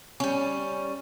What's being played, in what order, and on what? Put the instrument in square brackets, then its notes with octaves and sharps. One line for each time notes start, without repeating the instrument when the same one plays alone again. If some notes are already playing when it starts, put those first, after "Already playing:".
[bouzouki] G3 C#4